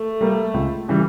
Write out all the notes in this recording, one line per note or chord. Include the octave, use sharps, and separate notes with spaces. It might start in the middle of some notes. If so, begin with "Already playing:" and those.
Already playing: A3
G3 A#3
C#2
C#3 E3 G3